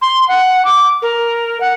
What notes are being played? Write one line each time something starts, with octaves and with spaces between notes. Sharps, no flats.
C6
F#5
D6
A#4
F#5